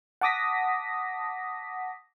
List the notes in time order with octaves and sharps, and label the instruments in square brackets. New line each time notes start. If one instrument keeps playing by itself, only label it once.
[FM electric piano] F#5 A5 D6 D#6 A#6 B6